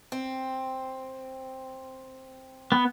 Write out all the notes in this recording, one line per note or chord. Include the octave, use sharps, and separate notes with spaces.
C4
B3